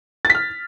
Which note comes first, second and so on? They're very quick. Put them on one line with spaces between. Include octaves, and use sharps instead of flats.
A6 B6 F6